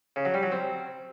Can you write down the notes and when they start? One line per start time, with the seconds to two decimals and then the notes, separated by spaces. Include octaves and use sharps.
0.16 C#3
0.25 F#3
0.34 G3
0.43 F#3
0.52 C4